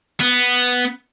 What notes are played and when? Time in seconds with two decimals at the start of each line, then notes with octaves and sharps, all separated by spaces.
0.20 B3